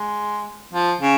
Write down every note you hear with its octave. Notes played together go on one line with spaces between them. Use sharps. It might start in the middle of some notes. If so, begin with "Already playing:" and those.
Already playing: G#3
F3
C#3